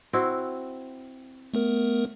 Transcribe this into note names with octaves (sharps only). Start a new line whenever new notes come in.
C4 E4 F#4
A3 B3 A#4